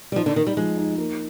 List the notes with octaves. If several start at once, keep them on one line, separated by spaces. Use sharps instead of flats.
G3
F3 D#4
D3
D#3 D#4
G3
F3 G#3
D#4
A#3